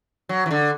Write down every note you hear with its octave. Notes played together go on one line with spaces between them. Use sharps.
F#3
E3
D3